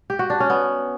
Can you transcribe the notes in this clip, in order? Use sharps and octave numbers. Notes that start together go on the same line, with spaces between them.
G4
F#4
D4
C#4
B3